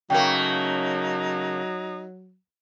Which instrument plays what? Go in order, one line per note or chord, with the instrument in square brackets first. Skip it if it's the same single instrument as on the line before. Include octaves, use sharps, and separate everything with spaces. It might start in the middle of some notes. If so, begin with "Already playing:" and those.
[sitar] C#3 A3 A#3 [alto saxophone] F#3 [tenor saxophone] D#4 [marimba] G5